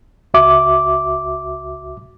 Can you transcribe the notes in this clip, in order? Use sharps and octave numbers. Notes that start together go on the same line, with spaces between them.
C#2 F#4 E5 D6